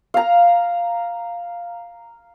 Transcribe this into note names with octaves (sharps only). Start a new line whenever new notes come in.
F5 A#5